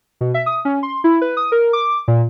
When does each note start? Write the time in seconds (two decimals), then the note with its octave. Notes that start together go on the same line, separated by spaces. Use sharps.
0.21 B2
0.34 E5
0.46 D#6
0.65 C#4
0.83 C6
1.04 E4
1.21 B4
1.37 D#6
1.52 A#4
1.73 D6
2.08 A#2